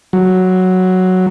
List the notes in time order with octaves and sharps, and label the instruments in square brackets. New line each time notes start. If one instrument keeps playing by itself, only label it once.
[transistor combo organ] F#3